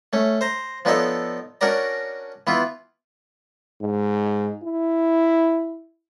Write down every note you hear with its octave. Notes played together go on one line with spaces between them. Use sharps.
A3 C#4
C5 A#5
F3 B3 D4 D#4 A4 C#5
C#4 D4 F#4 A#4 D5 A#5
E3 B3 E4 F4
G#2
E4